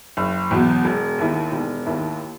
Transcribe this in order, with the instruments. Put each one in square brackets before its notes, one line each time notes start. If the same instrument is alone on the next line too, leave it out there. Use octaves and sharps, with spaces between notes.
[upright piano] F#1
E2 B2 F#3
E1
D#2 D#3 A#3 E4
E1
D#2 D#3 A#3 E4